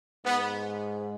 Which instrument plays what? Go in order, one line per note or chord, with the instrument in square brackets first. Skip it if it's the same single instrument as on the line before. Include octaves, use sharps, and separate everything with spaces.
[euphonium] G#2 [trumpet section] B3